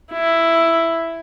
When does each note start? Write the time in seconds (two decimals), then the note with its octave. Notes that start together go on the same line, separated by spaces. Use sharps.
0.12 E4